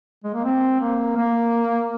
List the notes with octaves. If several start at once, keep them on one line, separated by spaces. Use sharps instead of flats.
G#3
A#3
C4
A#3
A#3